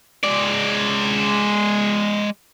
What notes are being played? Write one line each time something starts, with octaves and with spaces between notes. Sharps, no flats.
G#3 D5